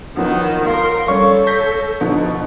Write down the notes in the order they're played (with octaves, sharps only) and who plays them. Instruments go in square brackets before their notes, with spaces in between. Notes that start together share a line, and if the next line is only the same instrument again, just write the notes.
[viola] D#3 [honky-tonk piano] F3 F#3 B3 [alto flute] F#5
[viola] A#4 C6 [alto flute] F5
[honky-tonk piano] G3 C#4 [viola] A4 [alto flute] C#5 [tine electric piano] C#6
[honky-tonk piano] G6 A#6 B6
[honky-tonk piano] B2 D3 F3 [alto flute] D#4